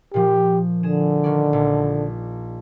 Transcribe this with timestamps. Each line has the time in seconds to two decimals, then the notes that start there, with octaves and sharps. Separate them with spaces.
0.14 A#2 F3 G4
0.83 D3 G#4 E7
1.24 D#3 C#4 D5
1.53 A#1